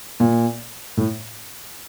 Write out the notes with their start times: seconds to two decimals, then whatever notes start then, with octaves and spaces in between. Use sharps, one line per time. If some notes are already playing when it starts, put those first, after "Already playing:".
0.20 A#2
0.97 A2